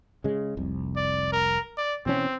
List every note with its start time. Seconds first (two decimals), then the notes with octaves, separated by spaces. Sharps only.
0.24 C#3 G#3
0.57 F1 C2
0.96 D5
1.32 A#4
1.77 D5
2.06 B2 E3 C4 C#4